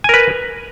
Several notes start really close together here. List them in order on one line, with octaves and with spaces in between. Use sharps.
G#5 A#4 B4